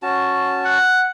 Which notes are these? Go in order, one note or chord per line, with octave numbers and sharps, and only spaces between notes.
C#4 F#4 A5
F#5